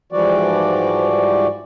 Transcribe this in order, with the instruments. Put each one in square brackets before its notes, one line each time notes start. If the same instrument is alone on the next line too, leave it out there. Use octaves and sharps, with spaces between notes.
[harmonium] G#2 E3 F3 G3 F#4 D5